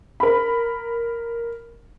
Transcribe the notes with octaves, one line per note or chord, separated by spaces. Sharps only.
A#4 B5